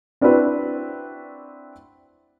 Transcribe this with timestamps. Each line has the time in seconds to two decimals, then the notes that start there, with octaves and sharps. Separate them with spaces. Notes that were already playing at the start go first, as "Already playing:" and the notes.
0.21 C4 D4 E4 F#4 B4